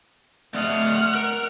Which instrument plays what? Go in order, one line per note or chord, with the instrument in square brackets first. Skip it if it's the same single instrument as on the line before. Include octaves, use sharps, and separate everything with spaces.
[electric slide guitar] A3 D5 D#5 [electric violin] F#5 F6
[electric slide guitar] A#4